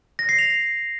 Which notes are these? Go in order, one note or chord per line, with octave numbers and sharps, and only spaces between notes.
A#6
C7
F7